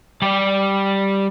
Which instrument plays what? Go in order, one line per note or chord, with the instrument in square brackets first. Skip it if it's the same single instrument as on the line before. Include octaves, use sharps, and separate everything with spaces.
[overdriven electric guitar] G3 D5